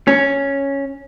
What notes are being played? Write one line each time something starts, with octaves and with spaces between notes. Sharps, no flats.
C#4